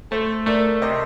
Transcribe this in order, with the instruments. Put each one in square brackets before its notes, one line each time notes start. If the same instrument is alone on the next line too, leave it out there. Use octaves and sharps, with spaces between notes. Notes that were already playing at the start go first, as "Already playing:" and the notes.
[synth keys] A3 [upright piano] A4 C5
[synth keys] A3 [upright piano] A#4 D5
[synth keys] C3 [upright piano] C5 D#5